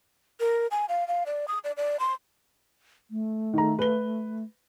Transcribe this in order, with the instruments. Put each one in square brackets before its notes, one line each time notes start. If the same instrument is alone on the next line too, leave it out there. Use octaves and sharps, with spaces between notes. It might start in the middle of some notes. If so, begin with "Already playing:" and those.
[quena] A#4
G#5
F5
F5
D5
D#6
D5
D5
C6
[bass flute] A3
[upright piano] D#3 A#5
B4 G7